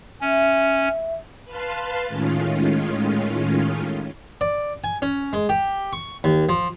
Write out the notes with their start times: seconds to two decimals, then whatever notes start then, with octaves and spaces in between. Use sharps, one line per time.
0.21 C#4 E5
1.45 B4 F5 A5 C6
2.08 A2 D#3 G#3 C#4 F4
4.41 D5
4.84 G#5
5.02 C#4
5.33 G#3
5.49 G4
5.93 C#6
6.24 D#2
6.49 F3